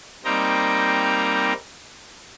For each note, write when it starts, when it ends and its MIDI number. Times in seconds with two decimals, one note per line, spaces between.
0.25 1.53 55
0.25 1.53 58
0.25 1.53 60
0.25 1.53 63
0.25 1.53 79
0.25 1.53 82